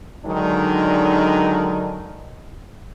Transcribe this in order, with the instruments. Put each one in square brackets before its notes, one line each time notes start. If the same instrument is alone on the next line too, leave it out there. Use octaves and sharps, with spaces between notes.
[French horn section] D3 D#3 F#3 G#3 D4 D#4